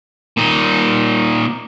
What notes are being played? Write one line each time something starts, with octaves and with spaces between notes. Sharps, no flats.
A#2 D#4